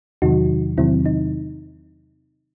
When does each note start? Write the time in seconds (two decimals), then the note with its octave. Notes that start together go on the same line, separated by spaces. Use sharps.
0.22 E2 C3 D#3 F#3 D#4 F#4
0.78 E2 C3 D#3 F#3 C4 E4
1.06 D#4